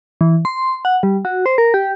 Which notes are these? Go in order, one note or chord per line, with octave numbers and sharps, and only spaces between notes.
E3
C6
F#5
G3
F#4
C5
A#4
G4